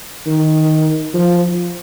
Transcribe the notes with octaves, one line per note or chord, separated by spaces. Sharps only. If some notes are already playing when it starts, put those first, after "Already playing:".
D#3
F3